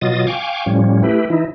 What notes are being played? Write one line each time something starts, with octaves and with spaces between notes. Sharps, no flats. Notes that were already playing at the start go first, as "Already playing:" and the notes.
B2 F#3 F4 D#5 D#6 A6
F5 G5 G#5 C#6 D6
A2 F3 G3 C#4
A3 E4 G4 B4
E3 D#4 E4